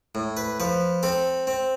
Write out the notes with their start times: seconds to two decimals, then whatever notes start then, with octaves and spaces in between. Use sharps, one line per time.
0.15 A2
0.37 B4
0.60 F3 B4
1.03 C4 A4
1.47 C4